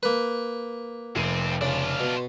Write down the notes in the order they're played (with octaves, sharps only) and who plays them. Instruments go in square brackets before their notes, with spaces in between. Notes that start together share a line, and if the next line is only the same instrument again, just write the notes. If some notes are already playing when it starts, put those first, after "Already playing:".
[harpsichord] A#3 B4
[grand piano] F1 D#7 [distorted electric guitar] F2 C4
[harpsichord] C#3 [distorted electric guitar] D4 F4
[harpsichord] B2